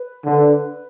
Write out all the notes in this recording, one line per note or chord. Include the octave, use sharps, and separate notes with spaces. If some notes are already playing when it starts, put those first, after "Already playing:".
Already playing: B4
D3